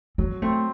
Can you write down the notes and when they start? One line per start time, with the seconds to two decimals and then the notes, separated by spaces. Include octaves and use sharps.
0.18 F#3 C4
0.42 A3 C4